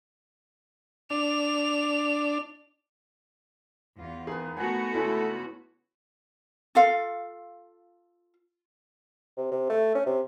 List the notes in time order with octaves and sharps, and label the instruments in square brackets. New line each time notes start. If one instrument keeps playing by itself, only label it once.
[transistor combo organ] D4 [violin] F7
[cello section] E2 F4
[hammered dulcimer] D#3 B3 [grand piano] G#4
[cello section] A3 B3 F#4 [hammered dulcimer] A4 F#5 G#5
[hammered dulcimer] C#3 E3 G#3 [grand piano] E4 [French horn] A4
[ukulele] F4 A4 F5
[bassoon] C3
C3
A3
C#4
C3